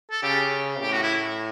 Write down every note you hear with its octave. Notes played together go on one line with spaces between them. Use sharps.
A4
C#3 G4
A2 G4
F#4
E4